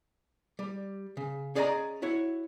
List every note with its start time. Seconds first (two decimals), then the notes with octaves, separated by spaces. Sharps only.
0.59 G3
1.17 C#3
1.55 C#4 G#4 D5 D#5 F5 A#5
2.02 E4 F#4 C#5